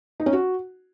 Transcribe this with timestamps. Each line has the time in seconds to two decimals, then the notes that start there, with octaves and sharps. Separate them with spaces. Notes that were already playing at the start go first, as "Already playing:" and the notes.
0.20 D#4
0.26 C#4
0.33 F#4